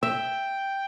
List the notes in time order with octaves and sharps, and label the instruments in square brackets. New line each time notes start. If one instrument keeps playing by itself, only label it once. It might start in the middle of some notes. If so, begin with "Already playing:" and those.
[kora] E5 [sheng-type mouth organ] G5